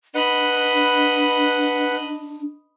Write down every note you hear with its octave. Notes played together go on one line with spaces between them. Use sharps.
D4 B4 D#5 F#5 B5